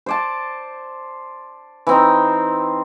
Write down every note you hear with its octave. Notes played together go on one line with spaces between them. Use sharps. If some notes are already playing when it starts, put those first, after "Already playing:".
C5 D5 A5
E3 C4 D#4